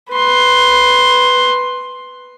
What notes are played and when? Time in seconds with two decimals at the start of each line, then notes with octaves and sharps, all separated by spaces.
0.12 B4 C6